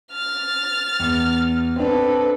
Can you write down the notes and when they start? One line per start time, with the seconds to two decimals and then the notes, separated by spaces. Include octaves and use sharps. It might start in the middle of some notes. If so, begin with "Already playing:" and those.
0.12 F6 A6
1.00 E2
1.76 C4 D4 A4 B4